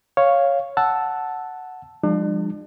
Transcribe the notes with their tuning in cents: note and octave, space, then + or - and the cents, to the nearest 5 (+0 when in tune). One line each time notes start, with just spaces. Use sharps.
C#5 +0 F5 +0
F#5 +0 A5 +0 E6 +0
F3 +5 G#3 -40 D4 +40